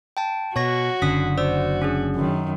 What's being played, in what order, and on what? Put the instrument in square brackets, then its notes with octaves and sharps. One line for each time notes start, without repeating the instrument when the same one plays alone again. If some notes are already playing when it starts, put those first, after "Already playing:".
[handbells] G5 A5
[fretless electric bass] B2 [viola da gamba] F#4 [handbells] C#5 C#6 A#6
[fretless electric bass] F#1 D3 [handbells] C#4 D#6 B6
[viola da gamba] F#4 [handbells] C5 D5 E6
[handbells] C#4 D4 G#4
[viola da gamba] F#2 D#3